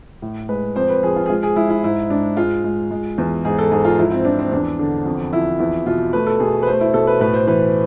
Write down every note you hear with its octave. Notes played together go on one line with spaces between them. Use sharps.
A2
G#3 B4
F2 C5
B4
F3 G#4
F4
G#4
G#3 F4
G#4
G#3 E4
E4
G#2 E4
G#2 D4
G#3 F4
G#3
G#3
E2
G#2 G#4
A4
G#2 G#4
F4
F3 E4
C4
F3 D4
C4
E2 D4
D3
F2
F3 E4
E2 E4
B2 F4
A3 B4
A4
B2 G#4
B4
A3 C5
E4
B2 A4
B4
A2 B4
C5
E3 B4